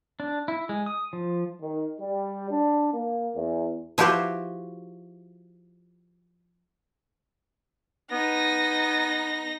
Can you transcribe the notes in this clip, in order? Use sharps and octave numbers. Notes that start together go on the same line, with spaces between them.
D4
E4
G#3
D#6
F3
D#3
G3
D4
A#3
E2
F3 E4 F#4 G4 B4 C5
B3 D#4 A#6